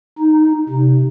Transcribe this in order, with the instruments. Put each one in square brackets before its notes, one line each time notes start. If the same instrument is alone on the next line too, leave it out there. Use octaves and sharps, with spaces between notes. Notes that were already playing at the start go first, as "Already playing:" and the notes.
[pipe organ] D#4
C3